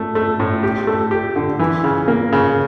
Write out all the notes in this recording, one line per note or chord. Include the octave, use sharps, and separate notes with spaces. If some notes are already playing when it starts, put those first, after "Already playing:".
Already playing: A3
A3
A2
G4
A3
G4
D3
E3
C#3
A#3
C#3